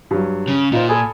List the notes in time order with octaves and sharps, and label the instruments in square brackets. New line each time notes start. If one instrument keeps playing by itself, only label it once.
[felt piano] G2 F#3
[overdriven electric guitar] C#3
[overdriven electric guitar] A#2 [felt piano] D#4 C5 [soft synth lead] F4
[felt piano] A4 B5 D#6 [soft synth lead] G#5